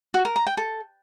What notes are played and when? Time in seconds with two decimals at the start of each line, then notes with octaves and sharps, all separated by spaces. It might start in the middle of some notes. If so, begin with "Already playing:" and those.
0.14 F#4
0.25 A#4
0.36 A#5
0.47 G5
0.57 A4